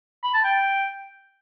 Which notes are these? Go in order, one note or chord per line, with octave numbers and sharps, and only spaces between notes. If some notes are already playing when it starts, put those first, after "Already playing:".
B5
A5
G5